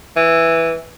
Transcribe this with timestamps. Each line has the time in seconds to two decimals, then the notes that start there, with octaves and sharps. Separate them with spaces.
0.17 E3